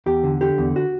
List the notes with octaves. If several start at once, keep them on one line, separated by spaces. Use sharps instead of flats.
E2 G4
D3
D3 G4
E2
F#4